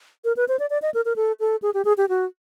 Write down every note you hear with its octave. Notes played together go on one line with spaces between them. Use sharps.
A#4
B4
C5
D5
D5
D#5
A#4
A#4
A4
A4
G#4
G4
G#4
G4
F#4